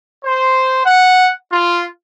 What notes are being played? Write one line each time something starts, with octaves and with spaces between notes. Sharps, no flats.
C5
F#5
F4